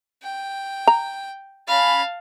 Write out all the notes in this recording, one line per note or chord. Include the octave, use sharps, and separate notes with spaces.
G5
A#5
C#4 F5 A5 B5